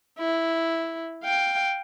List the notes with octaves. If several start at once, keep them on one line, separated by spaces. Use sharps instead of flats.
E4
F5 G5